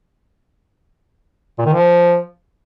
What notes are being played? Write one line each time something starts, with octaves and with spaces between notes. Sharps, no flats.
A#2
D#3
F3